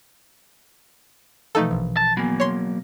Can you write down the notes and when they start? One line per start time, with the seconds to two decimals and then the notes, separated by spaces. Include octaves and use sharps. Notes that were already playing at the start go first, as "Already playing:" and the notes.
1.55 B2 E3 F3 A3 D#4 A4
1.71 A#1
1.97 A5
2.17 F#3 A#3 B3 G#5
2.40 C#5 C6